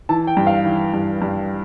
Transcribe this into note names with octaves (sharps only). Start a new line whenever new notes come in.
E3 A5
G5
G2
F5
E3
G2
G2